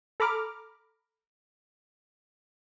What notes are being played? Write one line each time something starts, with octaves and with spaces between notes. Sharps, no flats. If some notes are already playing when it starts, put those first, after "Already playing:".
A4 A#5 B5 D6 F6